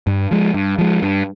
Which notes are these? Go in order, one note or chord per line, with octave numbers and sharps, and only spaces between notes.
G2
F3 G#3
G2
F3 G#3
G2